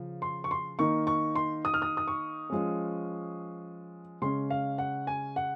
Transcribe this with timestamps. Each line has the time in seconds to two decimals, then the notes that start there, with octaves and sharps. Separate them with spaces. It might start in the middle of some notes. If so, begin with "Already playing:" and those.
Already playing: C#3 F3
0.22 C6
0.44 C#6
0.51 C6
0.79 D#3 A#3 D#4 C#6
1.07 C#6
1.36 C6
1.65 D#6
1.74 F6
1.82 D#6
1.97 D#6
2.08 C#6
2.50 F3 G#3 C#4
4.22 C#3 G#3 C#4 C6
4.50 F5
4.78 F#5
5.07 G#5
5.36 F#5